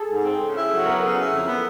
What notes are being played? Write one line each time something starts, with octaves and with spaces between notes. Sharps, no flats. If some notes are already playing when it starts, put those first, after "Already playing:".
Already playing: G#4 A4
G#2
C4
C#3
E4
F#3
B3 A#4
C#3
E4
F2
B3